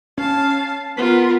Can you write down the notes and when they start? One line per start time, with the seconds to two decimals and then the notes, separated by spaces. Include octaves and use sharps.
0.18 C#4 F5 A5
0.97 B3 F4 A#4 B6